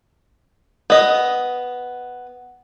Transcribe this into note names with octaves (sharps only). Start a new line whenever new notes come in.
B3 D#5